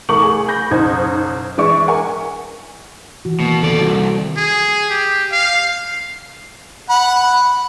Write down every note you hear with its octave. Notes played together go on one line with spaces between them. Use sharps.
C2 A3 A#4 C#6 D6 F#7
G#4
B5 G6 A#6
F#1 B1 D#4 C5 G#6
E3 G#3 D5 E5 C#6
A#4 F#5 G#5
D#3 E3 F#4
B2 A#3
F2 C3 D#3 A4 D5
C2 F#4
G#4
G4
F5
F#5 B5